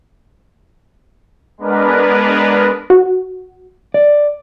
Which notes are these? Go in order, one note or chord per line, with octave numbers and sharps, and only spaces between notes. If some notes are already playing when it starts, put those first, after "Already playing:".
G#3 B3 D4 A#4 B4
F#4
D5